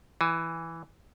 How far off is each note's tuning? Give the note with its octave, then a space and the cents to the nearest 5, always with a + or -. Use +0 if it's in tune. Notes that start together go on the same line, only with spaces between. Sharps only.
E3 +0 G#5 +20